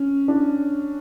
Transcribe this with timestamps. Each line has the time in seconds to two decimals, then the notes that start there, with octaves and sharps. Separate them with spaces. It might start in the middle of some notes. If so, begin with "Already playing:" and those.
Already playing: C#4
0.28 D4